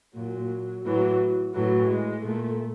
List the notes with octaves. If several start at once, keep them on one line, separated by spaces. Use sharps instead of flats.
A#2 F#3
A2 E3 F#3
A2 E3 F#3
G#3
A#2 A3